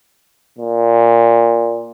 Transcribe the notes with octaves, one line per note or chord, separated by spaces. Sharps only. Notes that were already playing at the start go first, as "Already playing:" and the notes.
A#2